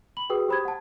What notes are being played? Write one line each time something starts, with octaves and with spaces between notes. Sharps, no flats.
B5 F#7
F#4 G#4 B4 G5 D#6
G4 C5 B5 D#6 G#6
F#5 A5